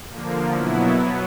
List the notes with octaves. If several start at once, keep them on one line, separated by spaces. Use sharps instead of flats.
D3 F3 A#3
B2 F#3 B3 E4
F#3 B3